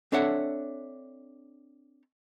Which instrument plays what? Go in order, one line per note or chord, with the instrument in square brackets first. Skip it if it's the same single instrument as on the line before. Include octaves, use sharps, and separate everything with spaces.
[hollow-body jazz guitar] C4 D4 A4 C#5 E5 F#5